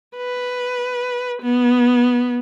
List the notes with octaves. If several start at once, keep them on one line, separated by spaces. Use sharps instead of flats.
B4
B3